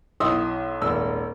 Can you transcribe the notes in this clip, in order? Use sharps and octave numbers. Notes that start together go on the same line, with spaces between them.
B1 E4 D#5 C6 D#6 E6
D#1 G#1 E6